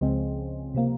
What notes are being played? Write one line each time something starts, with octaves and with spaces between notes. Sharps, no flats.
C#2 C#3 F3 G#3 C4
C3 F3 A#3